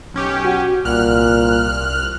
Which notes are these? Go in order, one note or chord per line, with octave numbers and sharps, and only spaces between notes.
B1 C#4 G4
F#4
C2 A#2 F6 F#6